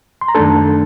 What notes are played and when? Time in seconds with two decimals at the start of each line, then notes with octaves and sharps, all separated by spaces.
0.21 C6
0.28 A#5
0.35 F#2 D#3 A3 D4 A4 A5